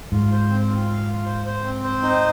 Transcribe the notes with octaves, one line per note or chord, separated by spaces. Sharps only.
G#2 F4
C5
C4
F4
F5
F4
C5
C5
C4
C5
D#4